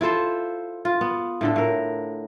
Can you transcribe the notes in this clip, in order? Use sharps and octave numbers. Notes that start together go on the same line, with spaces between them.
E4 F4 A4 C5
F4
B3
A2 D3 A4
A2 A#4